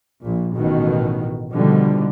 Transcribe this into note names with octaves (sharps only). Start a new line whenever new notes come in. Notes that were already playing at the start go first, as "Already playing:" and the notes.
A#1 A#2
A1 B2 D#3
B2 D3 D#3 F3 G3